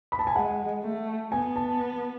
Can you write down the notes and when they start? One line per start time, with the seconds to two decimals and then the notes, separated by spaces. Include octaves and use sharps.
0.12 B5
0.19 A5
0.27 G#5
0.35 G#3 F#5
0.83 A3
1.32 B3 G#5
1.56 A5